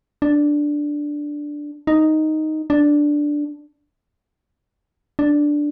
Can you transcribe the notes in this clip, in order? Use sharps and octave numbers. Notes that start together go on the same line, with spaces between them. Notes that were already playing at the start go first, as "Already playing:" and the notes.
D4
D#4
D4
D4